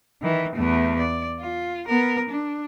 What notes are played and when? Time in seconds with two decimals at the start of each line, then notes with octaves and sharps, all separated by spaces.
0.22 D#3 E3
0.55 E2 A3
0.98 D5
1.40 F4
1.87 B3 A#4
2.29 D4